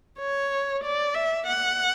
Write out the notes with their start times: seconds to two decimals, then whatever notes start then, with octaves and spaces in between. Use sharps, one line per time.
0.19 C#5
0.84 D5
1.15 E5
1.47 F#5